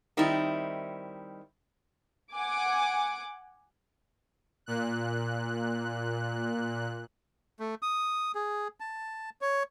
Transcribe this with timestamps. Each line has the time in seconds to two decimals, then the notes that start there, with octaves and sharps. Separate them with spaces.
0.17 D#3 G3 C4 D#4 E4
2.34 F#5 G#5 D6
4.66 A#2 F#6
7.60 A3
7.82 D#6
8.35 G#4
8.80 A5
9.41 C#5